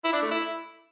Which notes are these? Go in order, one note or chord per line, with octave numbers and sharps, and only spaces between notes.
E4
D4
A3
E4